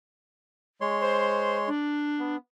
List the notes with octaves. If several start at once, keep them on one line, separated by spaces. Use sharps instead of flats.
G#3 C#5 C6
C5
D4
B3